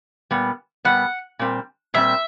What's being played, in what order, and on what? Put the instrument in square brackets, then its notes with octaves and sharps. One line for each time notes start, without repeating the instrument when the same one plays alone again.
[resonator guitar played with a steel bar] A#2 G3 B3
[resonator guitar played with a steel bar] A#2 G3 B3 [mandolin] F#5
[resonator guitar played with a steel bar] A#2 G3 C4
[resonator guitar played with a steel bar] A#2 G3 C4 [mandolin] E5